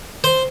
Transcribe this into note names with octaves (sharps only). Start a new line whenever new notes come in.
C5